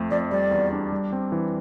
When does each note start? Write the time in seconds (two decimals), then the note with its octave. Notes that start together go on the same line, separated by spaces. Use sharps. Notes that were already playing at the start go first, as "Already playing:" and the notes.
Already playing: F2 A3
0.11 F2 D5
0.31 G3 D5
0.51 E2
0.72 D4
0.92 G3
1.12 C4
1.32 E3